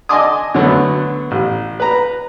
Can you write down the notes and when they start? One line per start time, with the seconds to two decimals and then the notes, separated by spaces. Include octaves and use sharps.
0.09 D#5 G#5 A5 C6 D6 D#6
0.54 D3 F#3 A3 B3
1.31 A1
1.80 B4 A#5